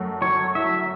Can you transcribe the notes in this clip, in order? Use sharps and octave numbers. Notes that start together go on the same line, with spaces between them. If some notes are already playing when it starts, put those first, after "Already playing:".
Already playing: F#2 A3
F#3 C#5
E4 E5